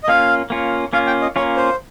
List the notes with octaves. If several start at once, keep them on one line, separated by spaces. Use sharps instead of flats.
D#5
A#3 C#4 F4 F5
A#3 C#4 F4
A#3 C#4 F4 F5
G5
D#5
A#3 C#4 F4 C#5
C5